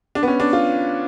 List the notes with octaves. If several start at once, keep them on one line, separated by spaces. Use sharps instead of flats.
D4
B3
C#4
D4
F4